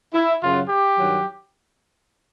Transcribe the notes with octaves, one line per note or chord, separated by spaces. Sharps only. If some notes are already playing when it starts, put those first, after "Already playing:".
E4
F#2 C#3 F#3 F4
G4
G2 D#3 F#3